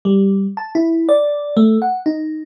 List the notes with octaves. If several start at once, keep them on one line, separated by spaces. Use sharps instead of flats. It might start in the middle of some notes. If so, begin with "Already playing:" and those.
G3
A5
E4
D5
A3
F#5
D#4